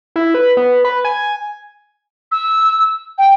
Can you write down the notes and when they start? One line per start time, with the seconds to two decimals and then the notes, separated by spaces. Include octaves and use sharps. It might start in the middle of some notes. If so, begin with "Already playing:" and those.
0.16 E4
0.34 B4
0.57 B3
0.85 B4
1.05 G#5
2.31 E6
3.18 G5